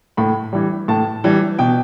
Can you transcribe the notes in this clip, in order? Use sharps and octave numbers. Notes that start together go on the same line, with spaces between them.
A2 B5
E3 G3
A2 A5
E3 G3
B2 G5